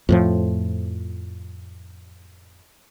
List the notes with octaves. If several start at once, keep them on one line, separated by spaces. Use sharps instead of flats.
F2 A2 F3